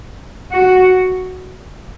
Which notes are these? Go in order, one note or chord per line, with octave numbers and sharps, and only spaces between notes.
F#4